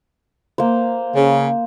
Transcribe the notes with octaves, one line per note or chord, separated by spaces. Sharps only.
A#3 C5
C#3